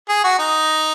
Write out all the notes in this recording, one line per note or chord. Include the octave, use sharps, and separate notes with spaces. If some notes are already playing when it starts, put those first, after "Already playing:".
G#4
F#4
D#4